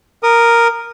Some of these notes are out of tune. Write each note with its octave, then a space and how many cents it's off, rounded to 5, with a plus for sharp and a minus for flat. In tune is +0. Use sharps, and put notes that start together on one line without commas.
A#4 +0 D#6 -20